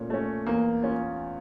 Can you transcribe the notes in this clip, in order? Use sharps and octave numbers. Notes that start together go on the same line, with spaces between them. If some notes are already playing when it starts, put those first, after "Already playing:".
Already playing: A#2 A3 C#4
A3 C#4
E2 A#3
C#4 F4